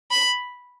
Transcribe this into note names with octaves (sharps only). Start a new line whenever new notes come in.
B5